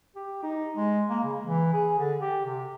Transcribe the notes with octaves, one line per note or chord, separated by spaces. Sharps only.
G4
D#4
G#3
A#3
C#3
E3
G#4
D3
G4
C3